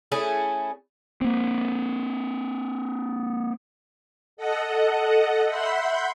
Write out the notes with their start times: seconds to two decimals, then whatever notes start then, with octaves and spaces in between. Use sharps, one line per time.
0.12 A3 C#4 E4 G#4
1.21 A#3 C4
4.37 A4 D#5 F#5
5.48 E5 F#5 B5 C6 G6